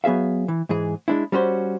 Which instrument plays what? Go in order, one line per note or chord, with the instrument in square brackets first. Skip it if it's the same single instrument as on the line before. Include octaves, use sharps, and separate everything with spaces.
[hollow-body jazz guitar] F#3 B3 G#4 E5 F5
E3
G#2 E3 G#4
G#3 D4 E4
G3 C#4 F#4 C5